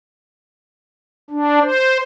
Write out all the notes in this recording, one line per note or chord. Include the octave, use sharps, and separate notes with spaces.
D4
C5